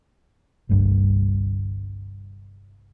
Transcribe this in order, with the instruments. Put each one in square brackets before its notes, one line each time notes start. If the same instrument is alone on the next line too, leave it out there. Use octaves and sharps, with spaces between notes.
[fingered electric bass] G1 C2 G2